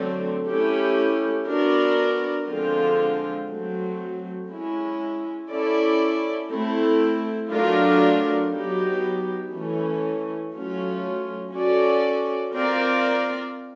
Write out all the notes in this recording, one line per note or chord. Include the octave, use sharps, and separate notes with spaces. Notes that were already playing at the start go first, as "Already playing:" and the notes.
Already playing: D3 F#3 A3 C4
A3 C#4 E4 G4
B3 D4 F#4 A#4
D3 F3 G#3 C4 F4
F#3 A3 C4
G#3 C#4 E4
C#4 E4 A4 D5
A3 C4 E4
F#3 A3 D4 F4 A#4
F#3 B3 D#4 G4
E3 A3 C#4
F#3 A3 C#4 F4
C#4 F#4 A4 D5
C4 F4 A#4 D5